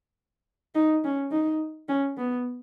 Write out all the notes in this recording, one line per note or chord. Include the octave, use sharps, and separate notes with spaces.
D#4
C#4
D#4
C#4
B3